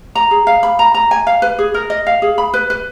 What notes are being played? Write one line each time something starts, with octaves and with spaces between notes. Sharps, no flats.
A#5
G#4
F5
B5
A#5
A#5
G#5
F5
B4
G#4
A#4
D#5
F5
G#4
B5
B4
B4